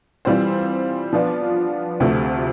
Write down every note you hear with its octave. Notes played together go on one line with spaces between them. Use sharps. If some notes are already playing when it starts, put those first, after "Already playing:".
E3 G3 C4 F4 C5
F3 B3 D4 F4
D2 C3 F3 A3